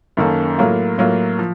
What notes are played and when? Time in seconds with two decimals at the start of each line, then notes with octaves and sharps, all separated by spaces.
0.17 F#2 D#3 A#3 C#4 A4
0.58 A2 F#3 A#3 F4
0.98 A2 F#3 A#3 F4
1.39 F3